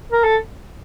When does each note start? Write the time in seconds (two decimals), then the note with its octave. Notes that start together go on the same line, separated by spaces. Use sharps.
0.12 A#4
0.24 A4